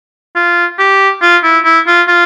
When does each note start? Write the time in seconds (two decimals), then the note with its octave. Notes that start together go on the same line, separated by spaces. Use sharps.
0.35 F4
0.79 G4
1.22 F4
1.44 E4
1.65 E4
1.87 F4
2.08 F4